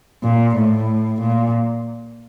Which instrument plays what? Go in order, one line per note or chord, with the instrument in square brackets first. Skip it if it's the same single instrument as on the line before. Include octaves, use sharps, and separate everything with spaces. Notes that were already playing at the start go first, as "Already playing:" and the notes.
[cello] A#2
A2
A#2